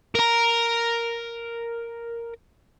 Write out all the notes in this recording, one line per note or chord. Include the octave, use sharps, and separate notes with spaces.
A#4 A#5